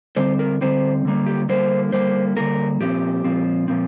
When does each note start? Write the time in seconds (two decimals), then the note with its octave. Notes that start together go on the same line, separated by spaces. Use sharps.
0.17 D3 G3 C4 C5
0.39 A#4
0.61 D3 G3 C4 C5
1.05 D3 G3 A#3
1.26 G4
1.49 D3 G3 A#3 C5
1.92 D3 G3 A#3 C5
2.36 D3 G3 A#3 A#4
2.80 A#2 F3 C4 G4
3.24 A#2 F3 C4
3.68 A#2 F3 C4